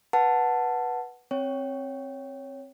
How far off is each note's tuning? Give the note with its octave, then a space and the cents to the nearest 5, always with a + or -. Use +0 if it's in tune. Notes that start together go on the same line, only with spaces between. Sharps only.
B4 -10 F#5 +0 A5 +0
C4 +15 C#5 +0 G5 +0